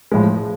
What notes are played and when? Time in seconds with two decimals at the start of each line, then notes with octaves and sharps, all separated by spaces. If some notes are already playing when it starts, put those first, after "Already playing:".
0.12 A2 F3 G#3